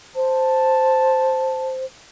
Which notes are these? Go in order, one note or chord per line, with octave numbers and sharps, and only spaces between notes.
C5 A5